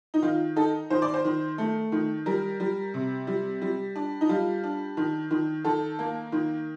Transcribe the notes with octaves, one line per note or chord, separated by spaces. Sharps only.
D#4
D#3 F4
D#4 A4
D#3 C5
D5
C5
D#3
A3
D#3
G3 A#4
G3
C3
G3
G3
D4
D#4
G3 F4
D4
D#3
D#3
D#3 A4
A#3
D#3